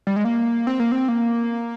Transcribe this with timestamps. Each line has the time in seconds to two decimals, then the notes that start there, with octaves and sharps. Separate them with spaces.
0.07 G3
0.16 G#3
0.25 A#3
0.67 C4
0.80 A#3
0.92 C4
1.08 A#3